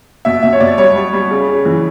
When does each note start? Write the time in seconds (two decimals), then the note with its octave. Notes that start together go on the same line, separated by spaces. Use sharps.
0.25 B2 E5
0.43 B2 E5
0.52 C#5
0.60 B2 D5
0.78 G3 C#5
0.95 G3
1.13 G3
1.31 C#3
1.48 C#3
1.65 E3